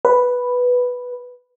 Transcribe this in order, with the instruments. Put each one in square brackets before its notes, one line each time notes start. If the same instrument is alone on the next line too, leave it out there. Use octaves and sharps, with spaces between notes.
[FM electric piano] B4